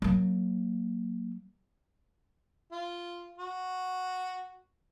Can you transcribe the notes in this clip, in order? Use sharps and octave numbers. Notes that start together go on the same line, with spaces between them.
F#3 A#3
F4
F#4